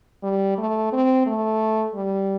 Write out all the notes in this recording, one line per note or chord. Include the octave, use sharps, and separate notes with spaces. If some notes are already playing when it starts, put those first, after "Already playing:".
G3
A3
C4
A3
G3